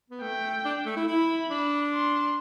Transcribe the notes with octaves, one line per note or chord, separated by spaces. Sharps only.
B3
A3 G5
D4
A3
E4
E4 B5
D4
C6